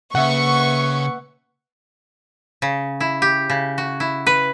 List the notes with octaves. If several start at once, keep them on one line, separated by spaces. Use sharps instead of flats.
C#3 A#3 B4 E5 F#5 C#6
C#3
E4
G4
C#3
F#4
E4
B4